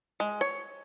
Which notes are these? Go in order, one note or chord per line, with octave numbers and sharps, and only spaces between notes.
G#3
C#5